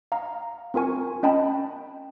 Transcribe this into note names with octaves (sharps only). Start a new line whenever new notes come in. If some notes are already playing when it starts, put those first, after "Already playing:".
F5 A#5
C4 F4 A#4 G#5 C#6
C#4 D#5 G5 A5 B5